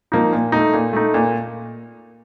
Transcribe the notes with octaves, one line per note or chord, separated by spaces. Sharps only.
F3 A#3 D#4
A#2
A3 D#4
A#2
A3 D#4
A#2